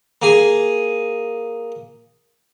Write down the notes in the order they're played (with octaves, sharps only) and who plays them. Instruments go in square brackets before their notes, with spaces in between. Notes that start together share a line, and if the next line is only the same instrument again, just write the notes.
[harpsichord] A#3 G#4 G#5